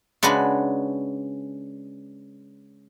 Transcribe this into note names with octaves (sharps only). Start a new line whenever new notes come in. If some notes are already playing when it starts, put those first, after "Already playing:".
C#3 G#3 D4 F#4 B4